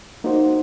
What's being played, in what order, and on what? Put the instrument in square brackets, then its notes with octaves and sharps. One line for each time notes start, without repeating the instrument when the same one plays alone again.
[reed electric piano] A#3 D#4 F#4 C5